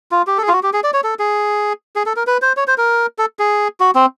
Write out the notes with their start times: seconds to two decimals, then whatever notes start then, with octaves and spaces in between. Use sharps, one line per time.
0.11 F4
0.27 G4
0.38 A4
0.42 G#4
0.48 F4
0.53 F#4
0.63 G4
0.73 G#4
0.84 D5
0.94 C#5
1.04 A4
1.19 G#4
1.96 G#4
2.06 A4
2.16 A#4
2.27 B4
2.42 C5
2.57 C#5
2.67 C5
2.78 A#4
3.18 A4
3.39 G#4
3.80 F#4
3.95 C4